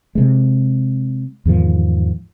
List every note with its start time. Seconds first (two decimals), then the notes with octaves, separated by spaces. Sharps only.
0.15 C3 G#3
1.45 E2 G#2 D#3 F3